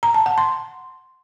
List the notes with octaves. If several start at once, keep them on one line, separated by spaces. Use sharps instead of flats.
A#5
A5
F#5
C6